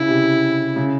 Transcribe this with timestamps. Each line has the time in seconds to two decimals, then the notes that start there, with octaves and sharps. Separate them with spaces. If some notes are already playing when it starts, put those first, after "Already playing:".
Already playing: C#3 E4
0.08 C3
0.76 C#3